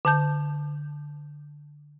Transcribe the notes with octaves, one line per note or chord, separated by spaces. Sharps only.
D3 A5 G6